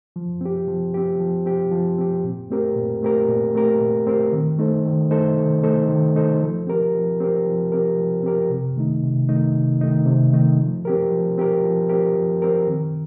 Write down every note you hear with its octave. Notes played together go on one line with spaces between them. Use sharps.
F3
C4 G4
F3
C4 G4
F3
C4 G4
F3
C4 G4
A#2
A3 C4 G4 A#4
A#2
A3 C4 G4 A#4
A#2
A3 C4 G4 A#4
A#2
A3 C4 G4 A#4
D#3
A3 D#4 A4 C5
D#3
A3 D#4 A4 C5
D#3
A3 D#4 A4 C5
D#3
A3 D#4 A4 C5
F3
C4 G4 A#4
F3
C4 G4 A#4
F3
C4 G4 A#4
F3
C4 G4 A#4
C3
D#3 A3 D#4
C3
D#3 A3 D#4
C3
D#3 A3 D#4
C3
D#3 A3 D#4
F3
C4 G4 A#4
F3
C4 G4 A#4
F3
C4 G4 A#4
F3
C4 G4 A#4
D#3